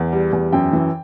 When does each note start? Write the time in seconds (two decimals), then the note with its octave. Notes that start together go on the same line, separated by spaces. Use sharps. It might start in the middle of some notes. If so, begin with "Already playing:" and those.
Already playing: E2 F#5
0.13 G3
0.33 E2
0.53 F#2 G5
0.73 E3